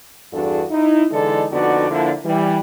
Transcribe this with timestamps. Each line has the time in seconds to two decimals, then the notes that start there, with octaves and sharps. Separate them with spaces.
0.33 E2 G2 D4 F#4 G#4 A4
0.71 D#4 E4
1.11 D3 E3 G#3 D#4 A4 D5
1.52 F2 D3 B3 D#4 F#4 D5
1.91 D3 F3 A#3 D4 E4
2.25 E3 G3